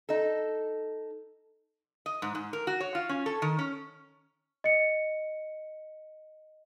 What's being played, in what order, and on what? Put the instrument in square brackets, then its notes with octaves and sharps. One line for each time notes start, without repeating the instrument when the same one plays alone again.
[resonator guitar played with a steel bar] D#4 A4
D#5
G#2
G#2
A#4
F#4
C#5
F4
C#4
A4
D#3
C#4
[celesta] D#5 C#7